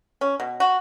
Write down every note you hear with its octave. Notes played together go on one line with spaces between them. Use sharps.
C#4
B2
F#4